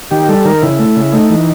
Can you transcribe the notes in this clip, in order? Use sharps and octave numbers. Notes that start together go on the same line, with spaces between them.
D#3 G4
G3 A4
D#3 A#4
C#3 E4
A3
C#3
A3 D#4
E3